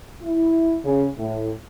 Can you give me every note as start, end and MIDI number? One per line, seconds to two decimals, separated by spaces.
0.22 0.77 64
0.84 1.06 49
1.17 1.50 45